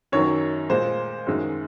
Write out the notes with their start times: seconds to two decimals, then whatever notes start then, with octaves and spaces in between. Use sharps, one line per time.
0.12 F#2 D#3 F#3 C#5
0.70 A#2 G#3 C5
1.27 F#2 D#3 G#3